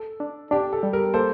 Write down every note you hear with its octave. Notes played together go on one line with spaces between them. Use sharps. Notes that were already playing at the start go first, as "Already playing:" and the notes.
Already playing: A4
D4
D4 G4
A4
G3
G4 A#4
A#3 A4 C5